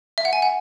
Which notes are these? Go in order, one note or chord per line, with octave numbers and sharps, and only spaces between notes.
E5
F#5
G#5
F#5